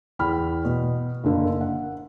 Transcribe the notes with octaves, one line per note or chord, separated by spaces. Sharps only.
E2 G5 B5 F6
B2
F#1 D3 A#3
F#5